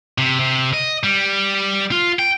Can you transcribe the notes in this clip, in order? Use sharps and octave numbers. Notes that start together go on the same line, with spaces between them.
C3
C3
D#5
G3
F4
G5